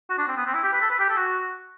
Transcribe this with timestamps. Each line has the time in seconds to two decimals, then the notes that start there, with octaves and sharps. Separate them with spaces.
0.09 F#4
0.18 D4
0.28 C4
0.36 B3
0.46 C4
0.54 E4
0.63 G4
0.72 B4
0.81 A4
0.90 B4
0.99 G4
1.09 A4
1.17 F#4